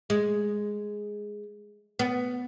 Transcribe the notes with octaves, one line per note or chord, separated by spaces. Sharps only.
G#3
B3